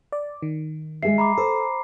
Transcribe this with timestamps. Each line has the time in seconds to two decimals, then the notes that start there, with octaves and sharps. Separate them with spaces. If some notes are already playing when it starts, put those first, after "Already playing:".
0.12 D5
0.42 D#3
1.03 G#3 G#4 E5 C7
1.18 A#5 B5 D6
1.38 A4 C5